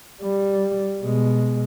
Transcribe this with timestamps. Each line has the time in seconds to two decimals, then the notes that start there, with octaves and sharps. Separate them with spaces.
0.22 G3
1.00 B2 G#3